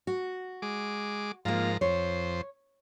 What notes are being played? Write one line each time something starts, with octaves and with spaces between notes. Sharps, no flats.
F#4
G#3 D6
G#2 F3 A#3 F4 A#5
F2 C5 C#5